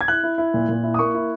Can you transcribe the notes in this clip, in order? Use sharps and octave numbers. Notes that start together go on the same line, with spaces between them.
G#6
E4 F#6
E4
E4
A#2
A#2
E4
D#6
A#3 C#6
E4